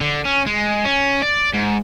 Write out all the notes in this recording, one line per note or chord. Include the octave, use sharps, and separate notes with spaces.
D3
C#4
G#3
C#4
D5
G#2